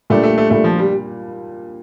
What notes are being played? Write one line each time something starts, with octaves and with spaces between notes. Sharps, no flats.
A#2 G3 A3 D4 G4
A3
A3
A#2 G3 A3 D4 G4
F3
G3